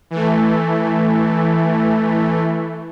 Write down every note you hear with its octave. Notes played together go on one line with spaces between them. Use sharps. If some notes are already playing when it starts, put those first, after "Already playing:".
E3 A3